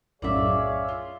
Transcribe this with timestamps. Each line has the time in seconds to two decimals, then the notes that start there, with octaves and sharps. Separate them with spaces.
0.22 B1 F#2 A2 G#4 C#5 D5 E5 F5
0.88 F4